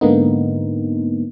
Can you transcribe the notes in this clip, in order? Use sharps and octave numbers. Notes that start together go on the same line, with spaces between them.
G#2 D3 A#3 B3 D#4